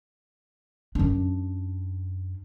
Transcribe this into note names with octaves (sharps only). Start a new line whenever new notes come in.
F#2 D4